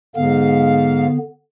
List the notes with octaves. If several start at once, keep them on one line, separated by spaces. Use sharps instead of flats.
G#2 D3 B3 F5